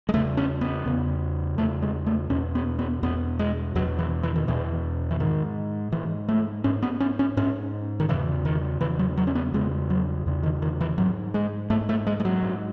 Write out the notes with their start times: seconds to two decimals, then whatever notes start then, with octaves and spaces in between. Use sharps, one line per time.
0.09 G#3
0.14 E2 C#3 A3
0.37 C#4
0.61 B3
0.86 E2 C#3
1.58 E2 C#3 A3
1.82 G#3
2.06 A3
2.30 E2 B2 C#4
2.55 B3
2.79 B3
3.03 E2 B2 B3
3.39 G#3
3.75 E2 F#3
3.79 B2
3.99 E3
4.23 E3
4.36 D#3
4.47 E2 B2 E3
5.11 E3
5.20 G#2 D#3
5.92 G#2 E3
6.29 A3
6.64 G#2 C#4
6.82 B3
7.00 C#4
7.19 C#4
7.37 G#2 C#4
8.00 D#3
8.09 E2 C#3 E3
8.45 D#3
8.81 E2 C#3 E3
8.99 F#3
9.17 F#3
9.27 C#4
9.35 B3
9.54 E2 C#3 G#3
9.90 F#3
10.26 E2 C#3
10.43 D#3
10.62 D#3
10.81 E3
10.98 G#2 F#3
11.34 G#3
11.70 G#2 A3
11.89 A3
12.07 G#3
12.20 G#3
12.25 F#3
12.42 G#2